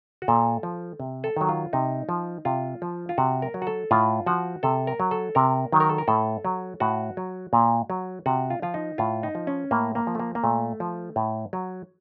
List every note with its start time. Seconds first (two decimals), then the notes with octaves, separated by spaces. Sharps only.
0.22 F#4
0.28 A#2 A4
0.63 F3
1.00 C3
1.24 A4
1.37 D#3 F#3
1.49 F4
1.73 C3 D#4
2.09 F3
2.45 C3 F4
2.82 F3
3.09 F4
3.18 C3 F#4
3.42 A#4
3.54 F#3
3.62 F#4
3.67 A4
3.91 A2 F4
4.26 F3 F#4
4.63 C3 A4
4.87 A#4
5.00 F#3
5.11 A4
5.35 C3 A#4
5.72 D#3 F#3
5.80 A#4
5.89 A4
5.98 A#4
6.08 A2 A4
6.45 F#3
6.80 A2 F#4
7.17 F#3
7.53 A#2
7.90 F#3
8.26 C3 F#4
8.50 F4
8.62 F3 F4
8.74 D#4
8.98 A2 F4
9.23 D#4
9.35 F3
9.47 C#4
9.71 A2 A#3
9.95 A#3
10.07 F3
10.15 A3
10.19 A#3
10.35 A#3
10.44 A#2 A3
10.80 F3
11.16 A2
11.53 F#3